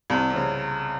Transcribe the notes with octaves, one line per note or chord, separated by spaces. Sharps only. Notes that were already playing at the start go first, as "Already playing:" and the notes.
C2 C3
C3
C#3